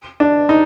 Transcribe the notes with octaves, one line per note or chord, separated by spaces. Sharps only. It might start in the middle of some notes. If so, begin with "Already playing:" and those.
D4
D#4